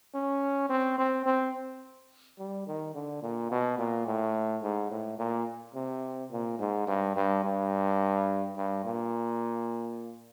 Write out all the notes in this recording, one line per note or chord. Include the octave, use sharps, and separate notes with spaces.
C#4
C4
C4
C4
G3
D#3
D3
A#2
B2
A#2
A2
G#2
A2
A#2
C3
A#2
G#2
G2
G2
G2
G2
A#2